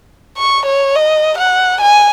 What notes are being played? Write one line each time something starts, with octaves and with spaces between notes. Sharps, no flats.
C#6
C#5
D#5
F#5
G#5